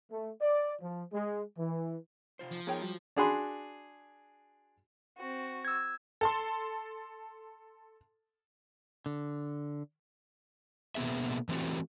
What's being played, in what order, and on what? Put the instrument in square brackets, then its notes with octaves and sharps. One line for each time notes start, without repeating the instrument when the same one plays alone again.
[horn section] A3
D5
F3
G#3
E3
[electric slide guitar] C3 F4 C5
[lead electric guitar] F3
[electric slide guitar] B3 D#4 A#4 [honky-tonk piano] G#4 C#5 G5
[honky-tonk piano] F#3 [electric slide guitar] G3
[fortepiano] D4 F#4 G#4 B5 C6
[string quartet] C4 F#4
[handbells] E6 G#6
[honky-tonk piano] A4 A5 C6
[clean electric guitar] D3
[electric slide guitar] B2 A#3 B3 G#4 E5
E3 A3 C4 F#4 G4